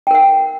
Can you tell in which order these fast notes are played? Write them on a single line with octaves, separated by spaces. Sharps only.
G5 A#4 F#5